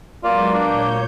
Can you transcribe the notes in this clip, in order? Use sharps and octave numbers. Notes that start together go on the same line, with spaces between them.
F#3 G#3 A#3 B3 F4 F#4 D5
A#2 D4 C#5 G6